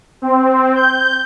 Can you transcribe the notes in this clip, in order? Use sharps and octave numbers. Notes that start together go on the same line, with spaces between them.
C4
G6